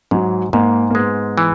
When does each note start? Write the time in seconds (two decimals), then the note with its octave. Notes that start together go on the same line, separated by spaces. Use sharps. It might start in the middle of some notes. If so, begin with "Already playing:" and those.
0.11 G#2 F#3
0.53 G#2 A#3
0.90 A#3
0.95 G#3 B3
1.38 E3